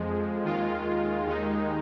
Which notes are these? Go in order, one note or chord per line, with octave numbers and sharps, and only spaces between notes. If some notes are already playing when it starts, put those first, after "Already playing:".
Already playing: F2 F3 G#3
D#2 D#3 G#3 F4
D#2 D#3 G#3 D#4